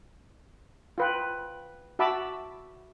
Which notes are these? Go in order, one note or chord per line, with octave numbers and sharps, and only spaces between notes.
F4 B4 G5
F#4 E5 A5 B5 D6 E6